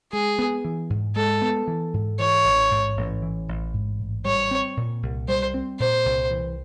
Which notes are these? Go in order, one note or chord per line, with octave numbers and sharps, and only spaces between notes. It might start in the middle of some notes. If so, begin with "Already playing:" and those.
G#3 G#4
B3
E3
G#2
G#3 A4
B3
E3
G#2
E3 C#5
A1
G#2
A1
E3
A1
G#2
A1
G3 C#5
C4
A#2
C2
G3 C5
C4
A#2 C5
C2
E3